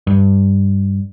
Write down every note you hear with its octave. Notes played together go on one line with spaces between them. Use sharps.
G2